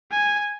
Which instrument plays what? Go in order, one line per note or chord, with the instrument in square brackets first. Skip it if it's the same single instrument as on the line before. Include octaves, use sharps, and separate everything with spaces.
[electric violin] G#5